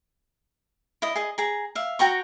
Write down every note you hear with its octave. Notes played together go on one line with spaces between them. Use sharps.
E4 D#5
G#4 D#5
G#4 A#5
E5 F5
F#4 G5 A#5 C#6